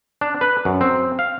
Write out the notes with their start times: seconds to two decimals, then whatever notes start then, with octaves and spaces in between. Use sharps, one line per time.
0.21 D4
0.41 B4
0.65 F#2
0.81 C4
1.19 F5